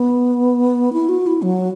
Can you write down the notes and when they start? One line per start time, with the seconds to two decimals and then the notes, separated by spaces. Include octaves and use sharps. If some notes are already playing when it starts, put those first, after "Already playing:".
Already playing: B3
0.93 E4
1.09 F#4
1.27 E4
1.42 F#3